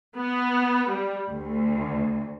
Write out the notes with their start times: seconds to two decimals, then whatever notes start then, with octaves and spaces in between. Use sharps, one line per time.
0.16 B3
0.89 G3
1.30 D2